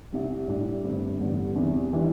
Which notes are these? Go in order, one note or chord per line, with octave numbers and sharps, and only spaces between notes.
C2 C3 G3
A2 G3 D4
G1 G2 D3 A3 C4
A1 G2 D3 G3 B3
E2 C3 G3
E3 G3 D4